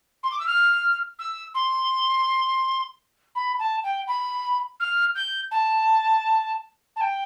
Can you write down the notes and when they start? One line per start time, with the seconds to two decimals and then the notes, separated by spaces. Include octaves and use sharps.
0.23 C6
0.31 D6
0.39 E6
0.47 F6
1.19 E6
1.54 C6
3.35 B5
3.59 A5
3.84 G5
4.07 B5
4.80 F6
5.15 G6
5.51 A5
6.96 A5
7.01 G5